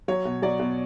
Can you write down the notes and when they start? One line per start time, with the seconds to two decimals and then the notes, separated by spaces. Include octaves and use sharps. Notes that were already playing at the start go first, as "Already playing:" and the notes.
0.08 F#3 C#5
0.25 B2
0.42 F#3 D5
0.60 B2